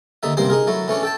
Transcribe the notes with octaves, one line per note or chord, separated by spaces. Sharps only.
D#2 D3 D#4 E5
A1 G2 C3 A#3 C5 C6
D#4 G#4 A#4
F#3 A3 E4
E3 A3 C#4 D4
A4 G5 A5